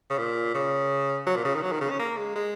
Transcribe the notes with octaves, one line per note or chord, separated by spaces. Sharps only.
C#3
A#2
C#3
F#3
A#2
C#3
D#3
F#3
D#3
C#3
C#4
A#3
G#3
G#3